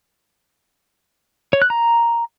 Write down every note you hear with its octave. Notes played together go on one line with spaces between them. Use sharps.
C#5
F#6
A#5